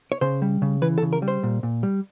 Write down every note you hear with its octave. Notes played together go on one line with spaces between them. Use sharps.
C#5
C#3 C5
G3
C#3
E3 B4
A4
C#3
A#4
G3
C5
A#2
A#2
G3